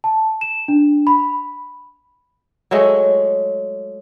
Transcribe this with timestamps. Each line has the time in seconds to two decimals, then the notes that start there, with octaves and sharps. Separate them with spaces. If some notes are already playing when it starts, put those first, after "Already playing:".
0.04 A5
0.41 E7
0.68 D4
1.07 B5
2.71 F#3 G#3 A3